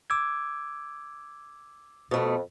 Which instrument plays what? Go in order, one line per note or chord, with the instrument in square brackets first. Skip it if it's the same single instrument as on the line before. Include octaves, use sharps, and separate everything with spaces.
[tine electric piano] D6 E6 G#6
[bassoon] F2 [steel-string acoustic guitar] B2 A3